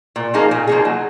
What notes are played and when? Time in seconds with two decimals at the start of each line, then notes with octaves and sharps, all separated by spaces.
0.16 A#2
0.34 F3 A#3 D#4 G#4
0.51 A#2
0.67 F3 A#3 D#4 G#4
0.85 F#3